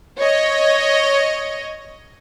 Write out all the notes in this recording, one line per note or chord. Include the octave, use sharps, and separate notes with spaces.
C#5 D#5